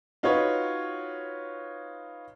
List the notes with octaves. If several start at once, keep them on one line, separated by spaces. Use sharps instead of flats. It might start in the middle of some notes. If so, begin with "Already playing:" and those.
D#4 F4 F#4 B4 C#5